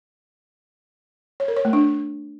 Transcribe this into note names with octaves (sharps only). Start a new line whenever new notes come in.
C#5
A#4
C#5
A3
D4